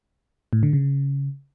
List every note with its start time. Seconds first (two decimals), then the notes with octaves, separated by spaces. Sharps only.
0.53 A2
0.63 D3
0.73 C#3